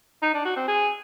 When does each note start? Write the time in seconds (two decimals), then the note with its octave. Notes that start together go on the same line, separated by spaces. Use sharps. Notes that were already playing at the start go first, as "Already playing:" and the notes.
0.23 D#4
0.34 D4
0.45 F#4
0.56 C4
0.68 G#4